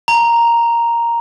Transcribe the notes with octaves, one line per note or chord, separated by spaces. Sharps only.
A#5